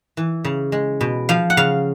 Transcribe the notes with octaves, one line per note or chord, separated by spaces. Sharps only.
E3
C#3
G#3
B2
F3 F5
F#5
C#3 F5